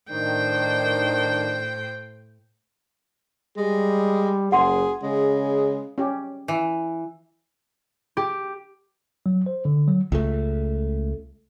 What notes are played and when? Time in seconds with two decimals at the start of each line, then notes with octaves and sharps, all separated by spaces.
0.10 A2 D#3 D4 C5 G5
3.57 G3 G#3
4.52 F#1 G#4 F#5 C6
5.03 C#3 G#3
5.98 C#4 G4
6.48 E3
8.17 G4
9.26 F#3
9.46 C5
9.65 D3
9.88 F#3
10.12 C#2 A3